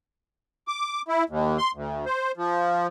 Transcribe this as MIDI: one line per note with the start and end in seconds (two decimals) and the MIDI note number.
0.68 1.02 86
1.08 1.24 64
1.29 1.58 39
1.58 1.71 84
1.74 2.05 38
2.06 2.31 72
2.37 2.87 53